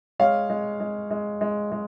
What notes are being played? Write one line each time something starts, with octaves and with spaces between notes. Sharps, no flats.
G#3 C#5 F5
G#3
G#3
G#3
G#3
G#3